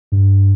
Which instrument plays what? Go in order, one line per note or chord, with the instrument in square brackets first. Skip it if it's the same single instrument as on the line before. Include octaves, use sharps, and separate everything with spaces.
[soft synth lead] G2